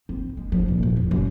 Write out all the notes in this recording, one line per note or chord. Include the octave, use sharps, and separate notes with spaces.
C4
G#3
F3
D#1
A#2
E2
F#2